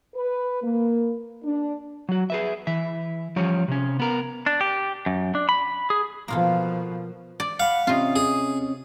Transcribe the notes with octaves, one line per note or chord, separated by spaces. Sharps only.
B4
A#3
D4
F#3 F#4
G#4 B4 E5
E3 E5
F3 G3 C#4 C#5
C3 C#4
B3 A#4
D4
G4
F#2
D4
B5
G#4
B2 F3 A#3 F4 A4
D5
F5 F#5 B5
C3 C4 C#4 F4 D#5
G#4